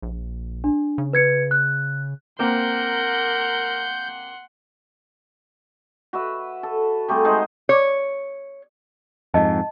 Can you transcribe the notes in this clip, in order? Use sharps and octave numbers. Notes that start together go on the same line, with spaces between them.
A#1
D4
C#3
B4 G#6 C#7
F#6
A#3 C4 A#4 F#5 C6 G6
F#4 B4 E5
A4
G3 A3 C4 G#4
G#3 D#4 C5 F#5
C#5
F2 G#2 D#5 A5